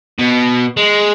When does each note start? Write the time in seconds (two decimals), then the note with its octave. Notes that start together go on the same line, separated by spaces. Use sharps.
0.19 B2
0.77 G#3